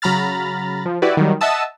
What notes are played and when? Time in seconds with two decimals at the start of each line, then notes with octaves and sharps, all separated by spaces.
0.02 C#3 F#3 A#5 B5 F6 A6
0.85 F3
1.02 E4 F#4 G4 B4 D5
1.17 D#3 F#3 G3
1.41 D#5 E5 F#5 A5 D#6 E6